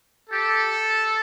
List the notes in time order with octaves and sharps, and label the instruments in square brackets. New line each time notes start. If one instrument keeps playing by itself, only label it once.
[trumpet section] G4 A4